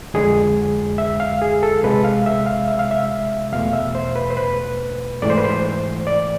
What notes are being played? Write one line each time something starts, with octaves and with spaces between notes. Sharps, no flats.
F2 D3 G#3 G#4
E5
F5
G#4
A4
C2 C3 G#3 B4
F5
E5
F5
E5
F5
E5
E2 B2 A3 F5
E5
C5
B4
C5
B4
G#2 E3 A3 D5
C5
B4
C5
D5